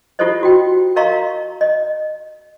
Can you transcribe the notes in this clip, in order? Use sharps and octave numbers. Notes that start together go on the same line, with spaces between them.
E4 F4 G4 A4 C5 D#5
F#4 G5
A#4 D#5 F5 A#5 C6 C#6
D#5